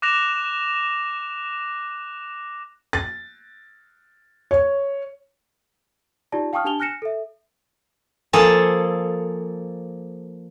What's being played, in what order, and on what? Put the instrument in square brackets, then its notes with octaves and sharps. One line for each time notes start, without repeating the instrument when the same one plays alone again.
[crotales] D6 F#6 A#6 E7 F7
[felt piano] A6
C#5
[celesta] D#4 F4 G4 D5 A5
F5 G5 A5 C#6 D#6 F6
D4 G4 G#5 A5 F7 G7
G#5 F6 F#6 A#6 C#7 E7
A4 E5
[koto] F3 A#3 G#4 A4